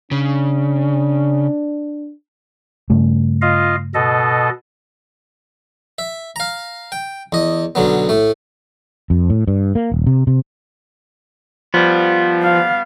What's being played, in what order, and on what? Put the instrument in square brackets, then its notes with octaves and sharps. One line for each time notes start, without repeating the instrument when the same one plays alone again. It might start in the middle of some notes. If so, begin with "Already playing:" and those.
[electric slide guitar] C#3 [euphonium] D4
[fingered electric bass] G2 C#3 A3
[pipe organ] F4 D#5 F5
B2 A4 D#5
[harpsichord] E5
F5 A#5
G5
E2 D#5
B1 D3 F#3 B3
A2 A3
[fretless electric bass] F2
A2
G2
A#3
D#1
C3
C3
[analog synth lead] F3 [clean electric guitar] G3 B3
[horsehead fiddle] F5